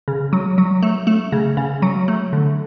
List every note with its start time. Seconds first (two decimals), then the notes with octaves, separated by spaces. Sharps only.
0.08 C#3
0.33 F#3
0.58 F#3
0.83 A3
1.07 A3
1.32 C#3
1.57 C#3
1.82 F#3
2.08 A3
2.33 D3